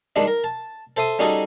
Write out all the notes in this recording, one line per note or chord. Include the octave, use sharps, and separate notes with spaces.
D#3 G3 G#3 D4
A#4
A5
A4 C5 E5 D#6
G3 C#4 D#4 F#4 G#4 A4